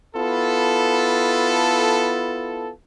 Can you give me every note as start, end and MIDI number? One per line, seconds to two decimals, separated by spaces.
0.15 2.71 59
0.15 2.71 64
0.15 2.71 65
0.15 2.71 69